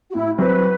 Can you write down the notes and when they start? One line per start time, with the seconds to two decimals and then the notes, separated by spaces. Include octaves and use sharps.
0.10 F#4
0.14 A2 E4
0.38 F#3 C4 F#4 B4 C5